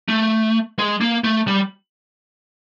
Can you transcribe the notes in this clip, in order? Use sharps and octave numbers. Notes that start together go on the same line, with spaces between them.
A3
G#3
A#3
A3
G3